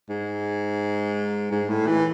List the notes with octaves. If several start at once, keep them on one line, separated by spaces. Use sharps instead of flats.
G#2
G#2
A2
E3